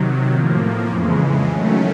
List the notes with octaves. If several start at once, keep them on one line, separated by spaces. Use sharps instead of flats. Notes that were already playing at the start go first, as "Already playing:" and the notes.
Already playing: C3 D#3 F#3
A2 F3 A#3
F2 C#3 E3 G#3
D#3 F#3 A3 C#4